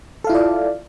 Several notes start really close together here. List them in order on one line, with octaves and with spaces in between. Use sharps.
A4 F5 E4 F4 D5